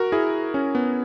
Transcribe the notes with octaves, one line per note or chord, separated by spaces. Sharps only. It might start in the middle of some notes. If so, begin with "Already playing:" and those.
Already playing: F#4 A#4
E4 G#4
C#4
B3